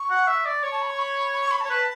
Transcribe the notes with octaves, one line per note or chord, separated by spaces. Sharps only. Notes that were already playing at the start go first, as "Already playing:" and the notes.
Already playing: C#6
F#5
E5
D5
C#5 C#6
A5
B5
C#6
B5
B5
C#6
B5
C#5 A5
B4